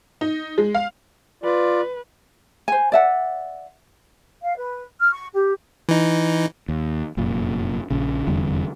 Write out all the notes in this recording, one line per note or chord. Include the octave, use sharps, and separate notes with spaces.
D#4
G#3
F5
F4 B4 D5
C5 G#5
D5 E5 F#5
F5
B4
F6
C#6
G4
E3 D#4
D#2
F1 F#2 A#2
A#1 C#3
F1 E2 D3 G3